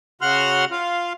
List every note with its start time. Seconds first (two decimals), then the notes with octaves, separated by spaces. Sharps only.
0.21 C#3 F#4 F#5 C6 F6
0.71 F4 F5